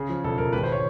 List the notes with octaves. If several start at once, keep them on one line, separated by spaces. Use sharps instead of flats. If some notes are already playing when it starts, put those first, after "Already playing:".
Already playing: C#3 G#4
F3
E1 A4
E1 A#4
G#1 B4
C5
C#5